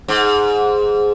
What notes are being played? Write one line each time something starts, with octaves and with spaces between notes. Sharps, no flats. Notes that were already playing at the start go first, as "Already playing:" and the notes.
G#2